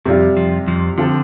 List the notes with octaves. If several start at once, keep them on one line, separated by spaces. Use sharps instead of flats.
F2 C3 F3 G3 F4
F2 F3
F2 F3
D3 F3 C4 F4 A4